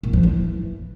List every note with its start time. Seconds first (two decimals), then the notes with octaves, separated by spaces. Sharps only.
0.03 A#2
0.13 F3
0.23 E3